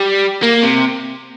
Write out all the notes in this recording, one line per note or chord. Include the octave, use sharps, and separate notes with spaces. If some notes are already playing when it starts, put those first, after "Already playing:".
Already playing: G3
A#3
C3